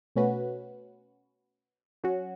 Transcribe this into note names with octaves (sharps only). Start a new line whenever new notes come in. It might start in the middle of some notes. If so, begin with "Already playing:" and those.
B2 A3 C#4 F#4 B4
F#3 C#4 F#4